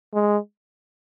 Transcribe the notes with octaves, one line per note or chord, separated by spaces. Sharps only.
G#3